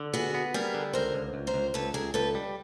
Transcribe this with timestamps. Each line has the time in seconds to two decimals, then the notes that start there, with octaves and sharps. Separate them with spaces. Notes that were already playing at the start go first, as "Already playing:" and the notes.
Already playing: D3
0.14 B3 F#4 G#4
0.34 B3
0.54 G3 G#4 A#4
0.74 D3
0.93 C#2 A#4 C5
1.14 C#2
1.34 C#2
1.47 A#4 C5
1.54 C#2
1.74 C#2 A4 B4
1.94 C#2 G#4 A#4
2.14 C#2 A4 B4
2.35 G3